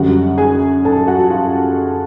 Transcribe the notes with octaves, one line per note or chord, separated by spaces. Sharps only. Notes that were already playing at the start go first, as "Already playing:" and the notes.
Already playing: F#2 D3 G3 F#4 F#5
G#4 G#5
A4 A5
F#4 F#5
F4 F5